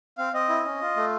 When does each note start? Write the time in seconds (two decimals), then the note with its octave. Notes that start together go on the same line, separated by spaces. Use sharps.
0.18 C4 F5
0.33 C4 D#5
0.49 E4
0.65 C#4
0.81 F4
0.96 A3